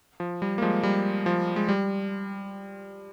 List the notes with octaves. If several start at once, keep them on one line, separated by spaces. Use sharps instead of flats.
F3
G3
A#3
F3 G#3
G3
F3
G#3
G3